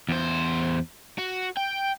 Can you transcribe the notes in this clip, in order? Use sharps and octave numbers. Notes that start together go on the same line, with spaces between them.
E2 C5
F#4
G5